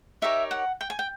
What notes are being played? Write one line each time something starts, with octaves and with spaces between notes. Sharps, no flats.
D#4 G4 A#4 C#5 E5
F#5
G5
G#5
G5